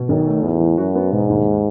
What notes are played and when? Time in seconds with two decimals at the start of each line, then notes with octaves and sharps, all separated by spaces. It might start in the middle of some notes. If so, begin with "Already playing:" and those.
Already playing: B2
0.09 B1 D#3
0.26 A3
0.43 E2 A2
0.60 E3
0.78 F#2 F#4
0.95 B3
1.12 E1 G#2
1.29 D#2